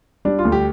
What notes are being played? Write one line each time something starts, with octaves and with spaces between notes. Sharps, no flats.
G3 D4
F4
D2
G4